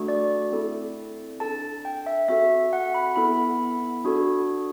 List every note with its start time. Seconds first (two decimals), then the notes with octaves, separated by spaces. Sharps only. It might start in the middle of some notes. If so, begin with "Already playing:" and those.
Already playing: A3 D4 F#4 A4
0.08 D5
0.52 C4 E4 A4
1.40 D4 A4 A5
1.85 G5
2.06 E5
2.28 C4 F#4 A4 E5
2.73 F#5
2.94 B5
3.16 B3 E4 A4 B5
4.05 D4 F#4 A4